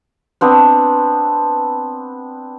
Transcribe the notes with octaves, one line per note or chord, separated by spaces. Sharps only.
B3 C4 D4